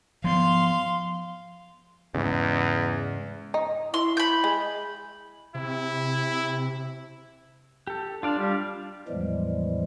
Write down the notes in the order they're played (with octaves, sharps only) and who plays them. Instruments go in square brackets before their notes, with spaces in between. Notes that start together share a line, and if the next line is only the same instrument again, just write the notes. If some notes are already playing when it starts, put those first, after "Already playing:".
[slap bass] F3 B3 [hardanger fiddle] F5 [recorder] C6
[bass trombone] E2 [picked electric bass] G#2 C#3
[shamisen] D#4
[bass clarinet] E4 [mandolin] C6
[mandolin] B5 G6
[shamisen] G#3
[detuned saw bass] C3 [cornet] E4
[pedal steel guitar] G4 A4
[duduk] D4 [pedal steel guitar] F4 D5 F5
[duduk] G3
[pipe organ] E2 A2 E3 F3 G3 G#3